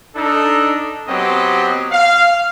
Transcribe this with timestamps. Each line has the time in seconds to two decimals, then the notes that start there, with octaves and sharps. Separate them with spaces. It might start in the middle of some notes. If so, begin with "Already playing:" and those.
0.16 D4 D#4 A4
1.08 F#3 B3 C4 G4 D#5
1.91 F5